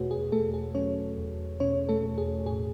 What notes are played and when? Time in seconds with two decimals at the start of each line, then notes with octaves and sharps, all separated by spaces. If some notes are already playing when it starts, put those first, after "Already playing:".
Already playing: E2 B2 A3 F#4 G#4 B4 C#5
0.11 G#4
0.32 E2 A3 A4
0.54 G#4
0.75 F#3 C#4 C#5
1.18 E2
1.60 B2 C#4 C#5
1.89 A3 A4
2.04 E2
2.18 G#4
2.46 A2 G#4